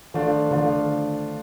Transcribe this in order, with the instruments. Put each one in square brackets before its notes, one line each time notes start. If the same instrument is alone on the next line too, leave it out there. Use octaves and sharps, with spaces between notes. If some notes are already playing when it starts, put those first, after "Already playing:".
[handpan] D#3 [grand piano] F3 A3 D4 F4
[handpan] D3 [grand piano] F3 A3 D4 F4
[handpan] D3